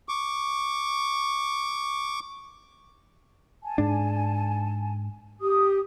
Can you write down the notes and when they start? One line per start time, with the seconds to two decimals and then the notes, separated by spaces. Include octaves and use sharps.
0.09 C#6 D6
3.63 G#5 A5
3.78 G#2 D4
5.40 G4 D#6